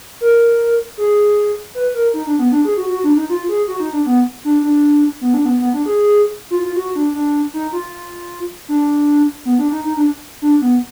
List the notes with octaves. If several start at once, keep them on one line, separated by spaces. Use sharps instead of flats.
A#4
G#4
B4
A#4
D#4
D4
B3
D4
G#4
F#4
F#4
D4
D#4
F4
G#4
F#4
D#4
D4
B3
D4
D4
B3
D4
B3
B3
D4
G#4
F4
F4
F#4
D4
D4
D#4
F4
D4
B3
D4
D#4
D#4
D4
D4
B3